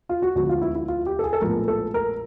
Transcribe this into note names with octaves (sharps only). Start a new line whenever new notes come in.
F4
F#4
D2 D3 F3 G#3 B3 F#4
F4
E4
E4
F4
G4
A4
G#4
A4
A#1 A2 F3 G#3 B3 A#4
A4
A#4